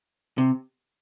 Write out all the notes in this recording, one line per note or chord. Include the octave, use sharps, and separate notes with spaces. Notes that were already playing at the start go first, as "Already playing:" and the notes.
C3